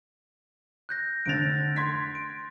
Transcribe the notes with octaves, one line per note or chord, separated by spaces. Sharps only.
F#6 G6 A#6
F1 D3 A6 D7 F7
C6 G#6 B6
D7